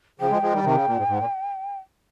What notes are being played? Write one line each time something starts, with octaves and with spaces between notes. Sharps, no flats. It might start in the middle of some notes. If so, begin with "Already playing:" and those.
C#3 F3 G5
F3 G#3
F3 G#3
D#3 G3
C3 D#3
C#3
A#2
G#2
G#2
A#2